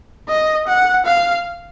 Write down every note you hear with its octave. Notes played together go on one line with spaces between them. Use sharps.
D#5
F#5
F5